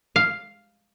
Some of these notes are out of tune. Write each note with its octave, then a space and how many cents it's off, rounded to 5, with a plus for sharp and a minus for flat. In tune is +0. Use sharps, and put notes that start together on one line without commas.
F5 +0